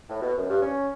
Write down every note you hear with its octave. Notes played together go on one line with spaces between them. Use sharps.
A2
B2
F#2
G2
C#4